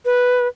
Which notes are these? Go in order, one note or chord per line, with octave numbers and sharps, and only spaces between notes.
B4